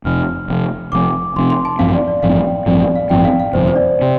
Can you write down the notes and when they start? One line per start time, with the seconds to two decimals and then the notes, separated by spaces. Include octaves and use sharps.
0.05 F1 F2 C3 F6
0.48 F1 F2 C3
0.92 F1 F2 C3 D6
1.36 F1 F2 C3 C6
1.50 C6
1.65 A5
1.79 A1 G2 F3 C4 F5
1.94 D5
2.08 D5
2.23 A1 G2 F3 C4 F5
2.45 G5
2.66 A1 G2 F3 C4 D5
2.81 D5
2.96 F5
3.09 A1 G2 F3 C4 G5
3.25 F5
3.40 F5
3.53 G1 F2 C3 C5
3.68 C5
3.76 D5
4.01 C3